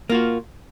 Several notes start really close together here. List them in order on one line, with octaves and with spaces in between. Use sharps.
A#3 F4 F#4